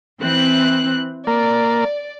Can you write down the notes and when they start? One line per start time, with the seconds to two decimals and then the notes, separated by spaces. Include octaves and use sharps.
0.20 E3 C4 F#6
1.27 A#3 D5